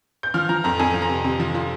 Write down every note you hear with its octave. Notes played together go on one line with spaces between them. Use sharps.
G6
F3 F6
F3 A#5
F2 A#5
F2 G#5
F3
A#5
C3
C3
F3
F3